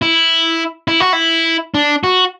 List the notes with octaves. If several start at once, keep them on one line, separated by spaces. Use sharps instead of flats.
E4
E4
F#4
E4
D4
F#4